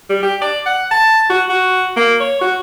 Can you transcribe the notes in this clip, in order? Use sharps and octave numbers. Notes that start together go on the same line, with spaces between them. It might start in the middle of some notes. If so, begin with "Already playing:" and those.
G3
G4
D5
F#5
A5
F#4
F#4
A#3
C#5
F#4